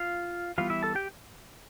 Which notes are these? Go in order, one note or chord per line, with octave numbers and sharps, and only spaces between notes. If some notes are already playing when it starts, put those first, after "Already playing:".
Already playing: F4 F5
E3 G3 B3 F4 F5
E4 E5
A4 A5
G4 G5